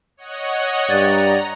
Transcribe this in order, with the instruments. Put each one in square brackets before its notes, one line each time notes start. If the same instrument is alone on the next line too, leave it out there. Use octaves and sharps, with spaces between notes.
[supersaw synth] C#5 D#5 F#5
[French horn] G2 [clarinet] D5 [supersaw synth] A#5